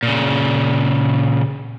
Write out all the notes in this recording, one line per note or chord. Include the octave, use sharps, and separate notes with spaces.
A#2 C#3